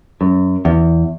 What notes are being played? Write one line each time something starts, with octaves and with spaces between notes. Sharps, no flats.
F#2
E2